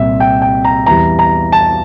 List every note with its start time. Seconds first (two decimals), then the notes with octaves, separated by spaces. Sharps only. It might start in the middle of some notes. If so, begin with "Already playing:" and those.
Already playing: C2 A#2 G3 E5
0.20 G5
0.42 G5
0.65 A#5
0.87 E2 E3 G3 A#5
1.19 A#5
1.52 A5